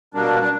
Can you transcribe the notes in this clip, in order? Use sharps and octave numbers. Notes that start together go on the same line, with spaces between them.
B2 G3 A#3 D4
D4